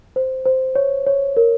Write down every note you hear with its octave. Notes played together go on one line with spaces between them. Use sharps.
C5
C5
C#5
C#5
A#4